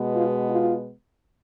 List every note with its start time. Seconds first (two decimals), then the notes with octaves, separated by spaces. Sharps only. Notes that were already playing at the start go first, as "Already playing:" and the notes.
Already playing: B2 G#3 B3
0.13 F4
0.49 F4